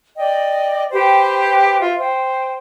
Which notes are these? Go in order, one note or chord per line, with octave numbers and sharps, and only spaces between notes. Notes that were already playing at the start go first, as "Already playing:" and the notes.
D5 D#5 G5
G4 B4 C5 G5
F4 E5
C5 G5